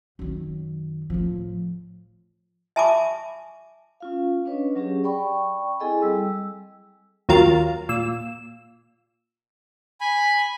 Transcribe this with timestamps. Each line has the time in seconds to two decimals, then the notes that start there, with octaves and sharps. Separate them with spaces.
0.19 F#2 D#3
1.10 A2 F3
2.76 E5 G#5 A5 B5 C#6 D6
4.00 C#4 F4 F5
4.45 C#4 D4 B4 C#5 D#5
4.76 F#3 C#4 G4 G#4
5.04 D5 G5 B5 C#6
5.80 C4 E4 G#4 A4 D#5 G#5
6.02 G3 E6
7.29 D#2 F#3 F4 A#4 F6 A6
7.89 A#2 E6
10.01 G#5 B5